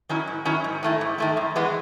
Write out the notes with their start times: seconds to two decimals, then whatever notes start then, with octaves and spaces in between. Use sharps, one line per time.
0.09 D#3 F#3 C#4 E4
0.27 G#2
0.45 D#3 F#3 C#4 E4
0.64 G#2
0.83 D#3 A3 E4
1.01 G#2
1.18 D#3 A3 E4
1.37 F#2
1.56 E3 G#3 B3